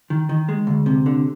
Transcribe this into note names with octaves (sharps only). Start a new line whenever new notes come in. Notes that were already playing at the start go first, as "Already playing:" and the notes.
D#3
D#3
G#3
D2
C3
D3